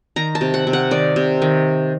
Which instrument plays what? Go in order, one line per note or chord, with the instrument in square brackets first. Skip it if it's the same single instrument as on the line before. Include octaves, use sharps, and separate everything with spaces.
[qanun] D#3 A#5
A5
C3
F#5
C3
F#5
D#3 D5
C3
D#3